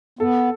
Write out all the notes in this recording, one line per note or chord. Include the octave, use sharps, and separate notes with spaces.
B3 A4